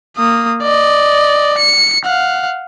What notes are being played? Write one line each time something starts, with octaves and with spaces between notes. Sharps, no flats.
A#3 D#6
D5 D#5
C#7
F5 F#5